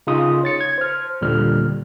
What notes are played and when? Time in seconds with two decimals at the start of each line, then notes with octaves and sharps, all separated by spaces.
0.07 C#3 D#4 F4 D#6
0.44 C#5 A6 C#7
0.61 G#6
0.78 C5 F6
1.21 D#2 A#2 D3 G3 F6